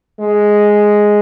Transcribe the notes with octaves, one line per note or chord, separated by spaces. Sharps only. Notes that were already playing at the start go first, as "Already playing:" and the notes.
G#3